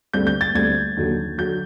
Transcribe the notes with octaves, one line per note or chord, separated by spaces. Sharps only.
D2 D3 G3 C4 G6
G6
A6
D2 D3 G3 C4 G#6
D#2 D3 F#3
D3 F#3 G6